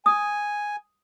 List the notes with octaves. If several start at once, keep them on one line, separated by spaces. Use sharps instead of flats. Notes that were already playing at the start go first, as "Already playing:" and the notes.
G#5 D#6